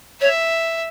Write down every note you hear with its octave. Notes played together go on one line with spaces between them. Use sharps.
C#5 E5